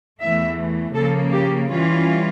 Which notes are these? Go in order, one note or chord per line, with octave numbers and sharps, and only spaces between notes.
E2 E3 A3 E5
C#3 F3 A#3 A4
G4
E3 G3 C#4 F4